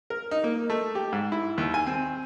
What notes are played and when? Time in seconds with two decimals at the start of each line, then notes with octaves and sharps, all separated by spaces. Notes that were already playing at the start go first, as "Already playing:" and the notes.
0.10 A#4
0.31 D#4
0.44 A#3
0.70 A3
0.95 G4
1.13 G#2
1.32 E4
1.58 D#2
1.74 G#5
1.87 C4